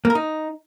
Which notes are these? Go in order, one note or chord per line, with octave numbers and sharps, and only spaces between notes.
A#3
A#4
D#4